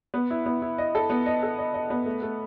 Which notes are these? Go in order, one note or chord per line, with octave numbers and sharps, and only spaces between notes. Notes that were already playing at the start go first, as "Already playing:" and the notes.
B3
E4
B3
E4
D#5
A4
B3
D#5
A4
D#5
D#5
B3
A3
A3